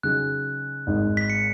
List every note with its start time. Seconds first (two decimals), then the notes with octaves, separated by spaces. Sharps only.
0.03 C#3 F#3 D#4 G#4 F#6
0.87 G#1 G#2 G#3 D#4
1.17 B6
1.30 C#7